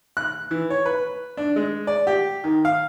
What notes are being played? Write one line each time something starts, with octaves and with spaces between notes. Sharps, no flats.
F#6
E3
C#5
B4
D4
G#3
D5
G4
D#3
F5